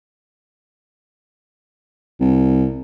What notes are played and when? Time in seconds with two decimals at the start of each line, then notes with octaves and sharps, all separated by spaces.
2.20 C2